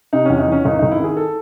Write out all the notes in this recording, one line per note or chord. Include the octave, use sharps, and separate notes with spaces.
C3 D#4
E2 C#4
D#4
E2 C#4
G#1 D#4
G#1 D#4
E4
D#3 G#4
A4